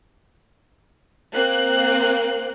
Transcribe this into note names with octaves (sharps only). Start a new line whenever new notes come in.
A#3 C4 F#6